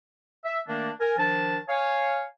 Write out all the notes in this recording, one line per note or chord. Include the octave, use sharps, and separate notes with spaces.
E5
D#3 A3 A#3 D4
A#4 G#5
D#3 F3 D4 A5
C#5 F5 G#5